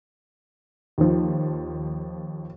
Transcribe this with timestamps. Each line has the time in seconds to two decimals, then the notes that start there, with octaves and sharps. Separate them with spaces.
0.98 D#2 F3